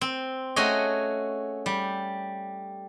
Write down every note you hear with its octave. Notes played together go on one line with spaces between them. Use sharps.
C4
A3 C#4 F#4 G#4 C#5 D#5
G3